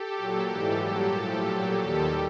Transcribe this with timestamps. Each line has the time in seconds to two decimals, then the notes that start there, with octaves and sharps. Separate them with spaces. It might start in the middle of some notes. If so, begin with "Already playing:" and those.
Already playing: G4 A4
0.14 A#2 F#3
0.48 G#2 E3 G3
0.81 A#2 F#3 G4 A4
1.14 A2 F3
1.48 A#2 F#3
1.79 D#2 D#3 G3 G4 A4